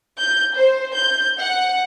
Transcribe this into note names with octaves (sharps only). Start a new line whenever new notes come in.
G6
C5
G6
F#5